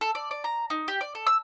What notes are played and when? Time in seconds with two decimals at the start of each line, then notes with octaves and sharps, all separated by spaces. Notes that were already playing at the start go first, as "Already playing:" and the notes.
0.01 A4
0.15 D5
0.31 D5
0.44 A#5
0.70 D#4
0.88 G4
1.01 D5
1.15 A4
1.27 E6